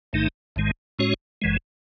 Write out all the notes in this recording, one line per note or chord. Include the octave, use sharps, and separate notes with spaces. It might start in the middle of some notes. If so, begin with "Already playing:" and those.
A1 G#2 D#3 A3 D#4
A1 G#2 D#3 G#3
A2 G#3 C#4 F#4 C#5
F#1 F#2 E3 G#3